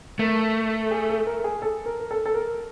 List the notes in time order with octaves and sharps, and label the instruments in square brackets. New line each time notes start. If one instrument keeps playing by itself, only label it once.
[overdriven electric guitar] A3 [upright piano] A#4
[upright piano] G#4
A4
A#4
G#4
A4
A#4
A#4
A4
A4
A#4